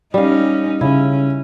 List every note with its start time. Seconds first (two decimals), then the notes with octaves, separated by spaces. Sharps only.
0.14 G3 C#4 D#4 F5
0.81 C#3 C#4 E4